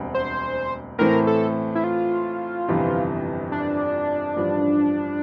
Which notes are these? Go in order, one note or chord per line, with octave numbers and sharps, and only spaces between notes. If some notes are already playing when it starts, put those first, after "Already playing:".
Already playing: E1 D2 G3 C4
C5
A2 E3 A3 C4 A#4
A4
E4
F4
G1 F2 C3 E3
D4
A1 G2 F3